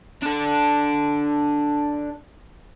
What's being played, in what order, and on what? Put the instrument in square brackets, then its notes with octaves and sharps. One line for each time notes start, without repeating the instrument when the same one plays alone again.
[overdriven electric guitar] D4 A4